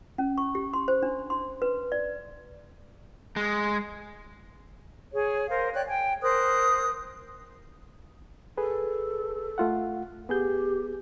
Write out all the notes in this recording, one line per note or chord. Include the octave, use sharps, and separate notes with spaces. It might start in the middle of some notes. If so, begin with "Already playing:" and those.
C#4
C#6
G4
C6
C5
D4
C6
B4
D5
G#3
G#4 C#5
A#4 C5 F5
C#5 D5 G5 F#6
G5 G#5
A#4 C5 D#6 F#6
G#4 A4 B4
A3 F4 F#5
B3 G4 G#4 G6